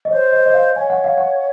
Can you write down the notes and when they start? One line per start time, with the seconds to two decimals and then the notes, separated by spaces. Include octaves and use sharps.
0.05 D#5
0.11 C5 C#5
0.32 D#5
0.46 D#5
0.54 F5
0.76 C#5 G#5
0.90 F#5
1.04 F5
1.18 F#5